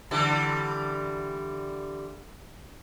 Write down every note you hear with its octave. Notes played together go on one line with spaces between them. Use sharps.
D3 E3 G3